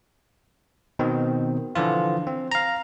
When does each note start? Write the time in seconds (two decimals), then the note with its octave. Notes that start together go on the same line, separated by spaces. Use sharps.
0.99 B2 D#3 C4
1.75 D3 E3 F3 F4
2.27 C4
2.51 F5 A#5